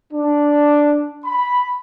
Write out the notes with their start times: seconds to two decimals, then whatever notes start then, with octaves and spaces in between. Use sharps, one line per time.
0.12 D4
1.25 B5